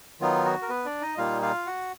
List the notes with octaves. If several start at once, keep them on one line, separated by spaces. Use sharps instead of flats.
D#3 F#3 B3 D#4 F4
F#4
A#4
B3 B4
D4 D5
D#4 D#5
A#2 G3 A#3 D#4 F4 F5
F4 F5
F#4 F#5